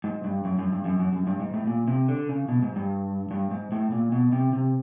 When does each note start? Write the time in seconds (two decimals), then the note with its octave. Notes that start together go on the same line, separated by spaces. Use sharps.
0.04 G#2
0.24 G2
0.45 F#2
0.59 F#2
0.72 G2
0.85 F#2
1.00 F#2
1.13 F#2
1.27 G2
1.40 G#2
1.54 A2
1.67 A#2
1.88 C3
2.08 D3
2.29 C#3
2.49 B2
2.62 G#2
2.76 G2
3.31 G2
3.51 G#2
3.72 A2
3.92 A#2
4.12 B2
4.33 C3
4.53 C3